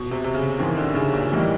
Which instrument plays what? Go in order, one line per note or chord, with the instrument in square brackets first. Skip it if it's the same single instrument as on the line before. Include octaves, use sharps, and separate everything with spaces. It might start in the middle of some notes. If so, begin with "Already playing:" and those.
Already playing: [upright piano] B2
C3
C3
C#3
[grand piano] G#2 E3 G#3 C4 [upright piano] D#3
[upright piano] D3
C#3
A#2
[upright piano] A2 [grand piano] E3 G3 A#3 D#4